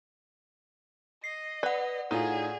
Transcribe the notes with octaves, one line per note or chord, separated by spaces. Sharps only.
D#5 C7
B4 D5 F#5
A2 D#4 F4 G#4